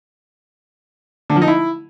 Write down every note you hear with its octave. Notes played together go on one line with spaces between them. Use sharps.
D3
F3
D#4
E4